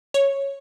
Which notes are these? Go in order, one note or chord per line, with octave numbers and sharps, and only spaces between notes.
C#5